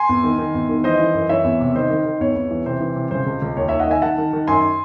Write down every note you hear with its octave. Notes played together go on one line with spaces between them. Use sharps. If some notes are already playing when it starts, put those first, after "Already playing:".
Already playing: G#5 C6
E2
D#3
D#3
E2
D#3
E3 C5 D#5
E3
F#2
E3 C#5 E5
E2
C3
D#3 C5 D#5
D#3
D#3
E2 C#5
E2
E3
C3 C5
E3
C3
C#3 C5
C#2
C#2
D#2 C#5
D#3 C#5 E5
D#5 F#5
D#3 E5 G#5
D#3 F#5 A5
D#3
D#3
F#2 G#5 C6